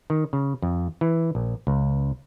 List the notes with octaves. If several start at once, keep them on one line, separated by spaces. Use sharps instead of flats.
D#3
C#3
F2
E3
A#1
C#2